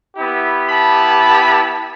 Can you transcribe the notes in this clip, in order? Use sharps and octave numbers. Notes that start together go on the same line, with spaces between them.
B3 E4 G4
A5 B5